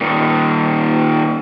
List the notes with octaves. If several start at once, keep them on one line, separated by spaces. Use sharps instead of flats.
A#2 D#3